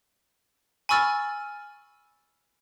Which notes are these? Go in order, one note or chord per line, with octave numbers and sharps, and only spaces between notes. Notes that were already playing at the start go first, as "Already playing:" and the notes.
G#5 B5 C#6 E6 F6 A6